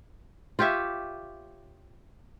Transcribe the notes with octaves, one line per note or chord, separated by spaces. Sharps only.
F4 G4 C#5 E5